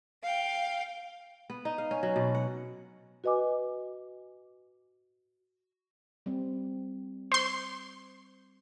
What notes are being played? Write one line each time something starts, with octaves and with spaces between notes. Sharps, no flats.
F5 G5
B3
D#4
F5
C#4
F#3
B2
F#5
F#4 B4 D#5 G#5 D6
G3 C4
C5 C6